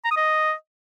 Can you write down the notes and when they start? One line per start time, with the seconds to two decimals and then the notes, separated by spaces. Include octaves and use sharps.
0.05 A#5
0.11 D#6
0.17 D#5